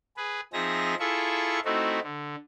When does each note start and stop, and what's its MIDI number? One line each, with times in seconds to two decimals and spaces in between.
0.17 0.41 68
0.17 0.41 71
0.53 0.95 53
0.53 0.95 60
0.53 0.95 63
0.53 0.95 68
0.53 0.95 76
0.53 0.95 94
0.99 1.60 64
0.99 1.60 65
0.99 1.60 68
0.99 1.60 69
0.99 1.60 76
0.99 1.60 85
1.65 2.00 57
1.65 2.00 60
1.65 2.00 63
1.65 2.00 64
1.65 2.00 66
2.03 2.36 50